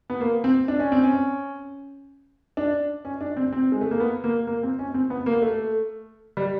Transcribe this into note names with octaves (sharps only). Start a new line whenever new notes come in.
B3
A#3
C4
D4
C#4
C4
C#4
D4
C#4
D4
C4
C4
G#3
A3
A#3
B3
A#3
A#3
C4
C#4
C4
B3
A#3
A3
G3